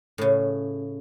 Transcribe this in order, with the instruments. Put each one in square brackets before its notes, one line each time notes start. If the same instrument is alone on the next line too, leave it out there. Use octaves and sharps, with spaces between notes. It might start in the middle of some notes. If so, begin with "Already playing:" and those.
[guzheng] A2 C#3